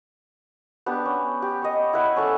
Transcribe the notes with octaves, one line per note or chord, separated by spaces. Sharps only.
B3 D4 G4
C#4
G4
C#5 D#5
E4 B4 F#5 G#5
C#4 A4 D5 A5